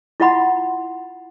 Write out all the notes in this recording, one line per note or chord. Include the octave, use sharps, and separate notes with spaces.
E4 F4 D#5 F#5 B5 C6